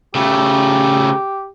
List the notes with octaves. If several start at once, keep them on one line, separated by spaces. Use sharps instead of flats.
C#3 A3 G4